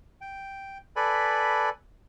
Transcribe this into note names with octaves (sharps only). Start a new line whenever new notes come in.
G5
A4 B4 D5 G#5 B5